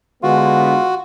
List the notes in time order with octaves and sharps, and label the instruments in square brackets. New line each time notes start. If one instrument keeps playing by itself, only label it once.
[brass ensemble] D3 G#3 B3 [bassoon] F4 [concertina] F#4